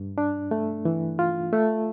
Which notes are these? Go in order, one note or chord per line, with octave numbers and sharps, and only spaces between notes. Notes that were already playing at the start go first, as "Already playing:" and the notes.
Already playing: G2
D4
A3
E3
F4
A3